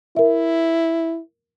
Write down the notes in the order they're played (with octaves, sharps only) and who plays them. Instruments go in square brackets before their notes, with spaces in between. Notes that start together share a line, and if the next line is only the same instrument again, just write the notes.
[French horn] E4 [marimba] A#4 E5